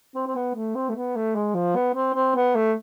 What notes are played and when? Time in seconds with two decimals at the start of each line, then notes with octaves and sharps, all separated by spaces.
0.15 C4
0.27 C4
0.35 B3
0.55 A3
0.75 C4
0.89 A3
0.95 B3
1.16 A3
1.35 G#3
1.54 F3
1.76 B3
1.94 C4
2.14 C4
2.35 B3
2.55 A3